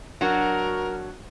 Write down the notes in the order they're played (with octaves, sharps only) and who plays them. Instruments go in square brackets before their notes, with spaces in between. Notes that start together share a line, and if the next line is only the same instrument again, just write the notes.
[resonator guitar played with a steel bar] F#3 D4 F#4 [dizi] A#4